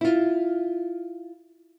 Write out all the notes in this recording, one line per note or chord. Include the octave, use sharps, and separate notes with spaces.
E4 F4